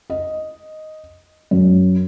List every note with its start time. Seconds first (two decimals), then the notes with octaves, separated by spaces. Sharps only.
0.10 D#5
1.51 F#2